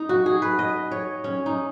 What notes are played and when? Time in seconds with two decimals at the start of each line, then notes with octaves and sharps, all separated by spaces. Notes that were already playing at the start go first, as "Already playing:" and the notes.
Already playing: D#4
0.09 F#4
0.26 G#4
0.42 B4
0.59 D#5
0.92 C#5
1.24 C#4
1.46 D#4